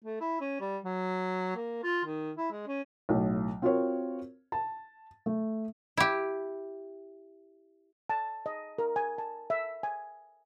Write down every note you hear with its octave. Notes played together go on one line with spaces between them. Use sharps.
A3
E4
C#4
G3
F#3
A#3
F4
D#3
E4
G#3
C#4
B1 A2
C4 F4 F#4 A#4 C#5
A5
A3
E4 G4
A5
D#5
A#4
G#5
A5
E5
G#5